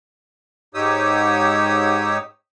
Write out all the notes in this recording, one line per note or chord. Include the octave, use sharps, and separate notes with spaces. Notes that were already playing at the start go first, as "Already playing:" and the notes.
G#2 D#4 G4 C#5 D#6 E6